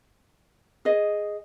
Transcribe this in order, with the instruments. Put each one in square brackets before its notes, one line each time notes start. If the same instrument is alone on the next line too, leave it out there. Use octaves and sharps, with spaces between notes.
[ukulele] G#4 D#5